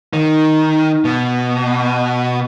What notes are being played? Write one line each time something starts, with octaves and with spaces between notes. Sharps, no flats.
D#3
B2